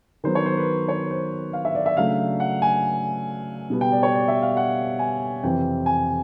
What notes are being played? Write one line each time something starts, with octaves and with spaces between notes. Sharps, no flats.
D#3 F#3 B3 C5
C#5
C5
B4
C#5
C5
F5
E5
D5
E5
C#3 F#3 A3 D4 F5
F#5
G#5
B2 G3 B3
G5
D5
C#5
D5
E5
F5
F#5
G#5
F2 C3 E3 G5
G#5